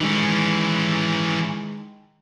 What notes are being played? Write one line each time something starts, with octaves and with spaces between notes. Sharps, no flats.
D#3 E3 G#3 C#4